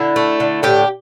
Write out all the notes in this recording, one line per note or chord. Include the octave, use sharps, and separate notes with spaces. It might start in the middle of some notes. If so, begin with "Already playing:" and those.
Already playing: D3 E4
A3
D3
A2 G4